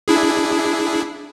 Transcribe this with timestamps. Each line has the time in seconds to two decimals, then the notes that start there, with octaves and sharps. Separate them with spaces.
0.08 D4 E4 G#4